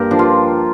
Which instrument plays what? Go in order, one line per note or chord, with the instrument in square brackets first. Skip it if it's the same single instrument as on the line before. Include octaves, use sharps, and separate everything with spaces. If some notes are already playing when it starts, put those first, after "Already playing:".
Already playing: [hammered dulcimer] G2 A#3 G4 A#4
F3 D4
F4